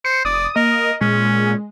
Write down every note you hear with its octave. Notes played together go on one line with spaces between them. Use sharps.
C5 C#7
F1 D5 D#6
A#3 A#4 D#5
A#2 G#3 C#4